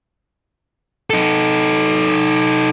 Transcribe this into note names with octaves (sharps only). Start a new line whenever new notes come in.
D#4 A4